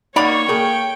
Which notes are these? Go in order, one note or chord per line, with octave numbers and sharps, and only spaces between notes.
A#3 D#4 C#5 D5 F#5 A#5 B5 C#6
A#3 G#4 A4 G5